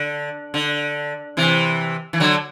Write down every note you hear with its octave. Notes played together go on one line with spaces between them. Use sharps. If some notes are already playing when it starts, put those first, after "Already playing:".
Already playing: D3
D3
C3 E3
E3
D3 F#3